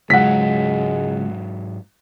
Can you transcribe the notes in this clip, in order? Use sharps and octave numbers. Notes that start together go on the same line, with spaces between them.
C#2 G#2 F#3 G#3 F#5 B6